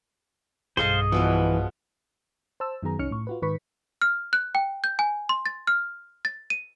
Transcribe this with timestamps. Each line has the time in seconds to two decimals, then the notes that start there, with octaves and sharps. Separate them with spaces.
0.77 B1 G2 G#4 A4 C5 D#5 F5
1.12 B2 E3 F3 G#3
2.60 C5 A5 E6
2.83 F#2 D#3 F#3 B3 G#4 A#5
2.99 C2 C#4 D#4 C#5 F6 C#7
3.11 A2 C#6
3.27 F4 F#4 B4
3.42 G#2 D#3 B4 C#6 B6
4.02 F6
4.33 F#6
4.55 G5
4.84 G6
4.99 G#5
5.29 C6
5.46 A6
5.67 F6
6.25 A6
6.50 D#7